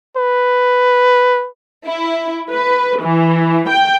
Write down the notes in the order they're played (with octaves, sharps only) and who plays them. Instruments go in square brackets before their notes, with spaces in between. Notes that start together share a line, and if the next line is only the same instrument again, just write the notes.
[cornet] B4
[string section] E4
B4
E3
G5